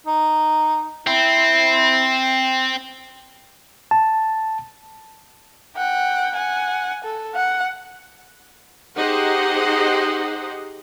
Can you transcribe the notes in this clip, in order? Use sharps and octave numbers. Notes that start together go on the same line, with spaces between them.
D#4
C4 E4
A5
F#5 G5
F#5 G#5
A4
F#5
D#4 G4 G#4 C5 D#5 F#5